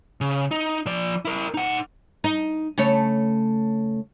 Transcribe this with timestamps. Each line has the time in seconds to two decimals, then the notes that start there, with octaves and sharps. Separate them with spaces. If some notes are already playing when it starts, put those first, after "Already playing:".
0.21 C#3
0.51 D#4
0.86 F3 D5
1.25 E4 A#4
1.54 D#4 F#5
2.24 D#4
2.78 C#3 A3 C#5